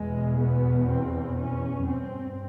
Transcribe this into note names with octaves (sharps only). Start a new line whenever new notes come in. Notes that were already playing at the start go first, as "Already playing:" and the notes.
Already playing: E2 B2 G#3
B3
C4
C#4
G2 C4